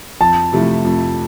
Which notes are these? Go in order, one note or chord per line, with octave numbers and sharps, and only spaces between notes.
F2 A5
C3 F3 A3 E4
F2